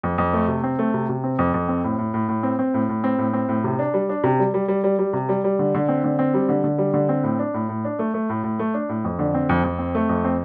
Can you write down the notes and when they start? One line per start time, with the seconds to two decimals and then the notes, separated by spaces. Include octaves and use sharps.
0.03 F2
0.18 F2
0.33 A3
0.48 C3
0.64 C4
0.79 A3
0.94 C3
1.09 C3
1.24 C4
1.39 F2
1.54 F2
1.68 C4
1.84 A2
1.98 A2
2.14 A2
2.29 A2
2.43 C4
2.59 C4
2.74 A2
2.89 A2
3.04 C4
3.18 A2
3.33 C4
3.49 A2
3.64 C3
3.79 D4
3.94 G3
4.09 D4
4.24 C3
4.39 G3
4.54 G3
4.68 G3
4.84 G3
4.99 G3
5.13 C3
5.29 G3
5.44 G3
5.59 D3
5.74 D3
5.89 C4
6.04 D3
6.19 C4
6.34 G3
6.49 D3
6.64 D3
6.78 G3
6.94 D3
7.09 C4
7.24 A2
7.39 D4
7.54 A2
7.69 A2
7.84 D4
7.99 A3
8.14 A3
8.29 A2
8.44 A2
8.59 A3
8.74 D4
8.89 A2
9.04 F2
9.19 D3
9.34 C4
9.49 F2
9.64 F2
9.79 C4
9.95 A3
10.09 F2
10.25 C4